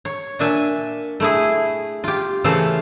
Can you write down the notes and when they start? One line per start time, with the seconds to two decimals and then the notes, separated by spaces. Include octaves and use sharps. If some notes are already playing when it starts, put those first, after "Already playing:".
0.05 C#5
0.39 A#2 D4 E5 G#5
1.20 A3 E4 G#4
2.04 F4 G4
2.44 C#3 E3 A3 A4 C5 F5